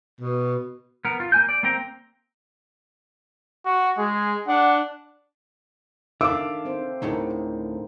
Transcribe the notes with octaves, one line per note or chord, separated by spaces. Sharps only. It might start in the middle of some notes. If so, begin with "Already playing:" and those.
B2
B3 A#4
F4
A#3 G#5 G6
D5
A#3 C4 G5 A#5
F#4
G#3 G#4
D4 F#5
D#3 D4 A4 E5 F5 D6 E6
C4 C5
D2 A2 D3 D#4 G#4 A#4